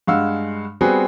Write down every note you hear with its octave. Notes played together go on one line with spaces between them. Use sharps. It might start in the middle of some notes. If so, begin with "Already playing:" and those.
G2 G#3 F5 F#5 E6
G3 B3 C4 F#4 G#4 B4